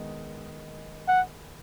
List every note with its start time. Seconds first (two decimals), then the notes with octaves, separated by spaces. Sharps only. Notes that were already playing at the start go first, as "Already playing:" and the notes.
Already playing: D#3 G#3 B3 D#4
1.08 F#5